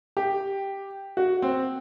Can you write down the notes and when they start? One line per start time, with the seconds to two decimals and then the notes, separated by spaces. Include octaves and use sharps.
0.17 G4
1.17 F#4
1.42 C4